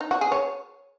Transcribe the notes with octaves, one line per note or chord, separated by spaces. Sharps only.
D#4
F#4
G#4
C#5